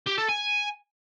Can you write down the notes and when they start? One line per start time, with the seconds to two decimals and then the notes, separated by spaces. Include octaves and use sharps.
0.07 G4
0.18 A4
0.29 G#5